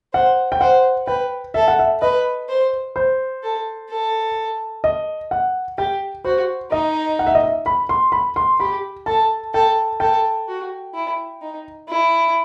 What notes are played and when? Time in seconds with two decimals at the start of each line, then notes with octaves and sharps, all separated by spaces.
0.13 C5 F#5
0.52 G5
0.61 C5 F#5
1.07 B4 G5
1.54 A4 E5
1.68 F#5
1.79 E5
2.02 B4 D#5
2.49 C5
2.96 C5
3.43 A4
3.90 A4
4.84 D#5
5.31 F#5
5.78 G4 G5
6.25 F#4 C5
6.72 D#4 D#5
7.19 F#5
7.27 E5
7.35 D#5
7.43 E5
7.66 B5
7.89 C6
8.12 B5
8.36 C6
8.60 G4 B5
9.06 A4 A5
9.54 A4 G5
10.00 A4 G5
10.48 F#4
10.94 E4
11.42 D#4
11.89 E4